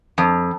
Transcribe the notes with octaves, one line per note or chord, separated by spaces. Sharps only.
F2